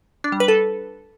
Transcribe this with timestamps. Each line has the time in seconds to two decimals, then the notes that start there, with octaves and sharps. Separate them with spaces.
0.24 D4
0.32 G3
0.40 B4
0.48 A4